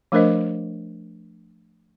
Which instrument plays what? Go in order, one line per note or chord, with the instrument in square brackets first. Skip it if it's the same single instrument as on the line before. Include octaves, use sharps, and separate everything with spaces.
[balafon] F3 A3 D4 A#4 C5 D#5